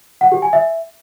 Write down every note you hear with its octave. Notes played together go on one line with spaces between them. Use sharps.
F#5
G4
G#5
E5